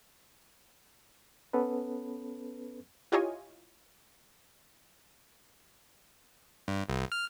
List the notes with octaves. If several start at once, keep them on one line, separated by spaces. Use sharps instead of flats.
B3 C#4 A4 B4
E4 F4 G4 C#5 D#5 G#5
G2
C2
F6